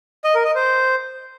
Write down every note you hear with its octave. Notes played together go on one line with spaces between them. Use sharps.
D#5
A#4
D#5
C5